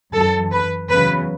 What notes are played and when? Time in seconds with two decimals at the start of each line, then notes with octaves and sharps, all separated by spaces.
0.13 F#2 E3 A4
0.52 B4
0.90 E2 C#3 F#3 B4